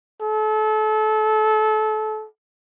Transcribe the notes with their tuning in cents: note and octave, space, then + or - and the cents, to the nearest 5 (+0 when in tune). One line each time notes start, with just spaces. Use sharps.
A4 -30